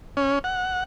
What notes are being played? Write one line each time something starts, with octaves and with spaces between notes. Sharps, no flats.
C#4
F#5